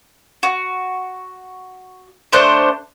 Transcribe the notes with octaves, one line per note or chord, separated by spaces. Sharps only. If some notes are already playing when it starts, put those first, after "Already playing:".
F#4
A3 D4 C5 F#6